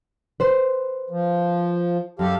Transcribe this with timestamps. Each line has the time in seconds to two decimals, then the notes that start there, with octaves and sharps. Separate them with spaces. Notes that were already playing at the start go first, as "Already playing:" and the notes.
0.40 B4 C5
1.10 F3
2.19 F#2 G4 A4 F5